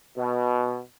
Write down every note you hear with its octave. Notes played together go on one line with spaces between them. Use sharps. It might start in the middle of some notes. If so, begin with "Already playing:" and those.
B2